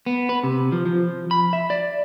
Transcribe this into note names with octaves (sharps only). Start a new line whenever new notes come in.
B3
B4
C3
F3
F3
B5
E5
D5